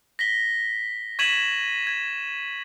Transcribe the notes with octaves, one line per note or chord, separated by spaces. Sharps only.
A#6 B6 G7
C#6 G#6 B6 D#7 E7 F#7
G#6